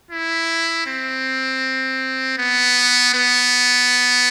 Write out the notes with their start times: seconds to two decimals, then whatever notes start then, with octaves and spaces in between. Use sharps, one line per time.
0.11 E4
0.86 C4
2.38 B3
3.14 B3